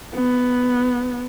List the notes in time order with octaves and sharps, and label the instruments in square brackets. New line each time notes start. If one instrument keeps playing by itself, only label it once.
[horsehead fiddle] B3